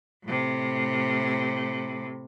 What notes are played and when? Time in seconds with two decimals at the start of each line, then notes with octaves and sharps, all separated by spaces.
0.24 A2 C3